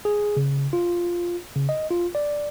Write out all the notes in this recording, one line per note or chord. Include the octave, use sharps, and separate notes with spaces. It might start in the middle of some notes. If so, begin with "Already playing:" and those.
G#4
C#3
F4
C#3
D#5
F4
D5